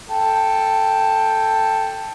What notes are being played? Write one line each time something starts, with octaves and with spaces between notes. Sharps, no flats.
A4 G5